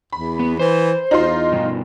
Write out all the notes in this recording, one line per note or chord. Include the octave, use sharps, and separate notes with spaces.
E2 B5
B3
E3 C5
E2 D#4 F4 C6
G2 B2